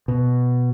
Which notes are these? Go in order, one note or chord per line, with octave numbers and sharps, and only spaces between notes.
B2